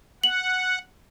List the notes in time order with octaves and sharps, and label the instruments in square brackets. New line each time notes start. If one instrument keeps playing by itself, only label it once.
[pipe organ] F#5 [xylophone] F#7